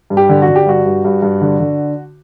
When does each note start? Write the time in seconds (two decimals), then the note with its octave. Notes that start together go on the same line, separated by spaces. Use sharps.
0.10 G2
0.17 G4
0.29 D3
0.42 F#4
0.48 D3
0.56 G4
0.66 G2 F#4
0.86 G2
1.05 G2
1.22 G2
1.41 D3
1.60 D3